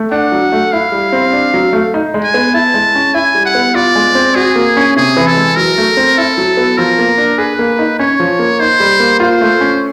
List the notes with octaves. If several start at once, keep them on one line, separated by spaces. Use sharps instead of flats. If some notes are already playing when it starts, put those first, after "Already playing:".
Already playing: A3
D4 F#5
F#3
A3
E4 F5
G3
C4
D4
F#3
A3
D#4
G#3
G#5
B3
E4 A5
G#3
C#4
E4 G#5
G3
F#5
B3
F4 D5
G#3
C4
F#4 G#4
A#3
C#4
C3 G#4
E3
A4
G#3
F#3 A#4
A3
C4
E4 A4
F#3
B3
F3 A#4
A#3
D4
G#4 B4
A#3
D#4
C#4 C#5
F3
A#3
D#4 C5
G3
A#3
F4 C5
A3
C#4